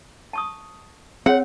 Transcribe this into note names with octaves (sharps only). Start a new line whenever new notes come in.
A5 C#6 D#6
C4 G#4 C#5 F#5